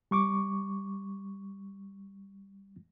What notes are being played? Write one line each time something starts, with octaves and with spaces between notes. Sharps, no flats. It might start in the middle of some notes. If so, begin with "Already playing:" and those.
G3 C#6 D6